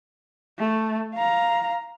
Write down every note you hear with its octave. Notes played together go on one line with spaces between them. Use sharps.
A3
F5 A#5